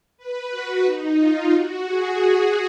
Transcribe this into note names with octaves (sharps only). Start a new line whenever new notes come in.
B4
F#4
D#4
F4
F#4
G#4